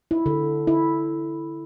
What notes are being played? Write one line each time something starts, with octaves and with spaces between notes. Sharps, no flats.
E4
D3
E4